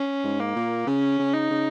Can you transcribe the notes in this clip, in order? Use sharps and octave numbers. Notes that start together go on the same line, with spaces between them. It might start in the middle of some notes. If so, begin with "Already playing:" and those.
Already playing: C#4
G#2
A#3
A#2
C#3 C#4
C#3
D#4
C#3